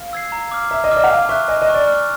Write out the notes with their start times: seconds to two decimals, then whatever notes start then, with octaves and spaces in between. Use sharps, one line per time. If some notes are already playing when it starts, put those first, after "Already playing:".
Already playing: F5
0.13 E6 G#6 C7
0.32 A#5
0.51 D6 F6
0.71 E5 A#5
0.84 D#5
0.91 D5 D6 F6
0.97 D#5
1.04 F#5
1.10 F5 G#5
1.29 E5 C#6 F#6
1.48 D#5 G#5
1.62 D#5
1.67 C#6 F#6
1.74 D5
1.87 F6